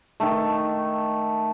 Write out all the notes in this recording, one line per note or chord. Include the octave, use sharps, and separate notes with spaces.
D#3 A3